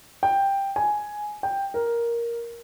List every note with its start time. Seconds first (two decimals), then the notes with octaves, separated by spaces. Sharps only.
0.23 G5
0.76 G#5
1.43 G5
1.74 A#4